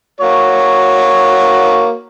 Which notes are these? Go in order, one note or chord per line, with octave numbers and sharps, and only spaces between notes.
A#3 F#4 C#5